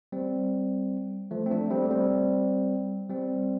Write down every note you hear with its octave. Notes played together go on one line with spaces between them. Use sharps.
G3 C4
F3 A3
C4
A3 D4
G3 C4
A3
G3 C4
G3 C4